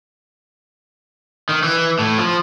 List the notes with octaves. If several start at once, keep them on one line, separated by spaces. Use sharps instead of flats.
D#3
E3
A2
F3